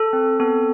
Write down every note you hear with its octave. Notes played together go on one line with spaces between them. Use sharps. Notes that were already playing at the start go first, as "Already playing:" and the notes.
Already playing: A4
C4
B3 A4